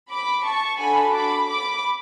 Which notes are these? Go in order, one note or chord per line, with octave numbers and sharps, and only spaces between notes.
B5 D6
A5 C#6
D4 F#4 A4 G#5 B5
B5 D6
B5 D6